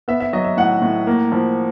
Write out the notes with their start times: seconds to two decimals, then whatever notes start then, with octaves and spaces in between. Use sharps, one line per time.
0.08 B3 E5
0.20 E5
0.33 F#3 D#5
0.44 E5
0.57 A2 F#5
0.82 A2
1.07 A#3
1.32 F3